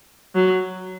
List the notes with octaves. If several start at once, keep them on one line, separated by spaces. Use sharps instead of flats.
F#3